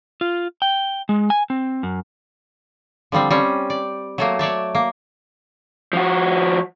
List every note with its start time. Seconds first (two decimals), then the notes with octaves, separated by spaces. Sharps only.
0.21 F4
0.62 G5
1.09 G#3
1.30 G#5
1.50 C4
1.83 F#2
3.12 D3 F3 G3 C4
3.30 G3 C4 C#4
3.70 D5
4.18 F#3 A3 A#3
4.39 C#5 D5 E5 A5
4.75 A#3
5.93 F3 F#4